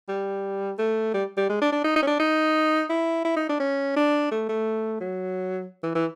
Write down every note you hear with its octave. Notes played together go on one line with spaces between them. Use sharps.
G3
A3
G3
G3
G#3
D4
D4
D#4
D#4
C#4
D4
D#4
E4
E4
D#4
D4
C#4
D4
A3
A3
F#3
E3
E3